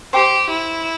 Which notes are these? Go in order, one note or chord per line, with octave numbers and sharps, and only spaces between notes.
G4 C5 G5 D6
E4